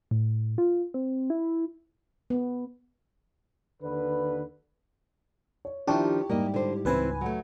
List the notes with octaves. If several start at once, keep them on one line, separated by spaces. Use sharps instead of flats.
A2
F4
C4
E4
B3
D#2 D3 B4
C#5
D#3 F3 D4 E4 G4 A5 C#6
G#2 G3 A#3 A#4 D#5
D3 C5
C#2 E3 C4 E4 B4 G#5
F#3 A3